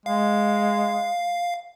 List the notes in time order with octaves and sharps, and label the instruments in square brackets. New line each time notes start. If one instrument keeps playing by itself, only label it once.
[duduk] G#3 [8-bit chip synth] F5